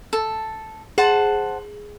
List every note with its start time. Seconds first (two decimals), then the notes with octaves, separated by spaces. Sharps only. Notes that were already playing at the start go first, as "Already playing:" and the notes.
0.13 A4
0.98 G#4 C5 F#5 A5